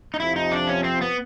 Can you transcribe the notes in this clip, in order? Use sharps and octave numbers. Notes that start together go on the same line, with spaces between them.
D#4
F2 C3 F3 E4
D#4
D4
C#4
C4
B3